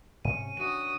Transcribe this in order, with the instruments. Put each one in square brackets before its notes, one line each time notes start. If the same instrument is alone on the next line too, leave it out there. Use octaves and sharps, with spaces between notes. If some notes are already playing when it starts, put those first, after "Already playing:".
[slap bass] G#2 C3 [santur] C#4 C#5 [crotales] D#7
[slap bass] D#3 D4 [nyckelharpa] F#4 D#6 [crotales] D#7